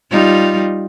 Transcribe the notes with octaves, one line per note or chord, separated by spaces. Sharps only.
G3 D#4 F4